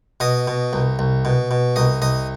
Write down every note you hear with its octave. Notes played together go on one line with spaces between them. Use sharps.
B2 D#5
B2
C2
C2
B2
B2
C2 D#5
C2 D#5